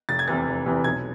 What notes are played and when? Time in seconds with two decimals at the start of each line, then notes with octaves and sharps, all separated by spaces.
0.09 F1 A6
0.19 G#6
0.28 E2 C3 E3 A6
0.48 F1
0.66 E2 C3 E3
0.84 B1 G#6